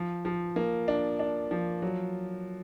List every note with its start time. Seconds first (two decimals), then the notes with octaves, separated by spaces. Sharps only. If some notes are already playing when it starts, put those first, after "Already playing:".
Already playing: F3
0.25 F3
0.56 A#3
0.88 D4
1.19 D4
1.51 F3
1.82 F#3